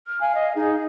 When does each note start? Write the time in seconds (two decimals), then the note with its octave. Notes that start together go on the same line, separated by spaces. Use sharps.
0.07 F6
0.21 F5 G#5
0.35 D#5
0.56 D#4 G#4